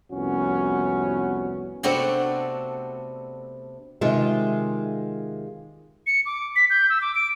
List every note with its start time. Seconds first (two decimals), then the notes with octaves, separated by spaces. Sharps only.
0.11 C2 F2 B3 C#4 F#4
1.83 C3 A3 B3 C4 D4 F#4
4.01 C3 D#3 G#3 F4 E5
6.07 C#7
6.26 D6
6.56 B6
6.70 G6
6.90 E6
7.02 D6
7.15 D7